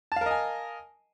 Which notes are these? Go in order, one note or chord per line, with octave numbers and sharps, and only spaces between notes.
A#4 D#5 F5 G#5 A5